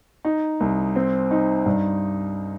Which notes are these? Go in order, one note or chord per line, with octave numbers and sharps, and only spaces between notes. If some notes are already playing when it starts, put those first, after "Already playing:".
D#4
C2
C4
D#4
G2